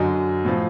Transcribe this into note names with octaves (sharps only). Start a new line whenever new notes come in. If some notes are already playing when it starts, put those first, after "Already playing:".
Already playing: F#2 D3 F#3 D#5
A2 F3